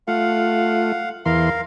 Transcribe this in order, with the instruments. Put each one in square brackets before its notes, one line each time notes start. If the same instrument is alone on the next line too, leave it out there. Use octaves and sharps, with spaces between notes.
[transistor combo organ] A3 F4 [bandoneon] F5 F#5
[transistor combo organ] E2 E3 C6 [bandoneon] A#4 F5